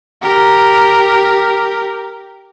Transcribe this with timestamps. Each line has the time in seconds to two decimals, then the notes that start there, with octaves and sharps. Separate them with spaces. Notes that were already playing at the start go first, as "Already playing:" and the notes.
0.23 G4 A#4